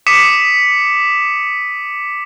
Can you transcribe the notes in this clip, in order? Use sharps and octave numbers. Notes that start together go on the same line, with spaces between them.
D6 D#6 B6 C#7 D#7 E7